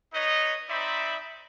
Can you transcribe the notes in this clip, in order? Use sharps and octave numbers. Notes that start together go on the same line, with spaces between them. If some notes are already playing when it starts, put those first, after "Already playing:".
D#4 B4 C#5 D#5
C4 D#4 C5 D5 E5 B5